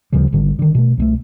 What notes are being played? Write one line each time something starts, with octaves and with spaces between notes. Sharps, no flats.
D2 C#3 F3 G3
G#1 G#2 D3 G3
D3 D#3
B2 A3
C2 G#3 A3